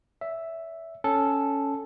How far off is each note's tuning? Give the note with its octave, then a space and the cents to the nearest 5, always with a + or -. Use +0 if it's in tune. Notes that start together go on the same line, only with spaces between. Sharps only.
C#5 +45 E5 +0
C#4 +5 A4 +0